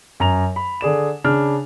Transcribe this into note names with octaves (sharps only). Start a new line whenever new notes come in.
F#2 A#5 F7
B5
D3 G#4 D5 E7
C#3 D4 F6